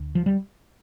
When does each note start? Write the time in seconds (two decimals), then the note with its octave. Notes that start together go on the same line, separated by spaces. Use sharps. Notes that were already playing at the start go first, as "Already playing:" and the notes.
Already playing: D2
0.15 F3
0.26 G3